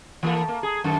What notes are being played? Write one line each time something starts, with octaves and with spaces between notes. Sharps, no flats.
E3 A#3 A4
A#3
G#4
F#2 D#3 A4